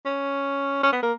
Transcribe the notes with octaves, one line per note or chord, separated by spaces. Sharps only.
C#4
C#4
B3
A#3